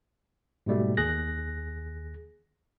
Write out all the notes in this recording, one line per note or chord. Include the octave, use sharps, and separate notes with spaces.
G#2 B2 G3 A3
D#2 G#4 F#6 A#6